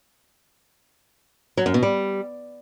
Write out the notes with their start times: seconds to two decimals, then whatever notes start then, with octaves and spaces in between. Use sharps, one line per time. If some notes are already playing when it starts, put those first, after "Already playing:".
1.57 F#3
1.66 F#2
1.74 B2
1.83 G3